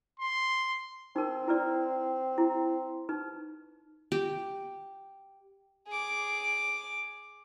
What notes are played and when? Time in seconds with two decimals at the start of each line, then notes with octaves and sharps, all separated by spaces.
0.20 C6
1.16 C4 D#4 A#4
1.48 E4 B4 D5
2.38 E4
3.09 D#4 B4
4.12 G4
5.88 G#4 D6